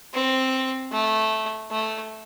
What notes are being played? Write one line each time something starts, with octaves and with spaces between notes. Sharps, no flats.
C4
A3
A3